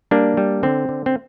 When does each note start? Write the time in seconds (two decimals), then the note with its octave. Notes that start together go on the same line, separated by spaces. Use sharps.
0.11 G3 A#3 D4
0.37 G3
0.63 D3 C4
0.89 D3
1.06 C4